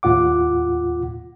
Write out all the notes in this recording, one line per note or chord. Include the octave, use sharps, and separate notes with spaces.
D#2 A2 F4 F#5 D6